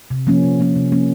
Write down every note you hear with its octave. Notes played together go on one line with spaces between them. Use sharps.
C3
F3 A#3 C#4
C3
F3 A#3 C#4
C3
F3 A#3 C#4